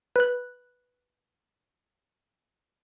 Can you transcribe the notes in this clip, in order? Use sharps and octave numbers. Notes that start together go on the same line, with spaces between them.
B4 F#6